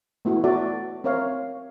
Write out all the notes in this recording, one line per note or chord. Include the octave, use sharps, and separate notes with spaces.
A3 B3 E4 F#4
F#4 A4 D5 E5
C4 A#4 C#5 E5 F5